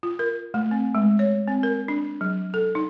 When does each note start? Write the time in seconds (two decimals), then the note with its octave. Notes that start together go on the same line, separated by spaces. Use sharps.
0.03 F4
0.19 A#4
0.54 A3
0.71 C4
0.95 G#3
1.19 C#5
1.48 C4
1.63 A#4
1.88 D4
2.21 F#3
2.54 A4
2.75 D#4